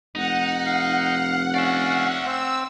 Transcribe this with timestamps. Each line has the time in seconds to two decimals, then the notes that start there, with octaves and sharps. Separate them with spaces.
0.15 F1 D#4 F#5
0.66 F5
1.54 C#4 D5 E5 F5
2.25 C4 E6